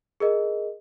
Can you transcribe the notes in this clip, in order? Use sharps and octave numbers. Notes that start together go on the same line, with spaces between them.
G#4 A#4 D#5